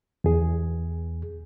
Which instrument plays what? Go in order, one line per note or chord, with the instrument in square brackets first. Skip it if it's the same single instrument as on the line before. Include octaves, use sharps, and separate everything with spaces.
[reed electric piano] E2 G#4